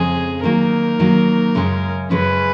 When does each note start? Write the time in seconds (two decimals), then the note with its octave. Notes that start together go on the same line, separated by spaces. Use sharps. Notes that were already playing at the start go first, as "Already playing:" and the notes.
Already playing: F2 C#3 G#3 G#4
0.43 D#3 F#3 A#3 D#4 A#4
0.99 D#3 F#3 A#3 D#4
1.55 F#2 C#3 G#3 C#4
2.11 F#2 C#3 G#3 C#4 B4